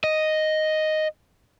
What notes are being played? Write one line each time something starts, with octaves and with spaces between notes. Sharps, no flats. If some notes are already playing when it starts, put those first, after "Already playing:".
D#5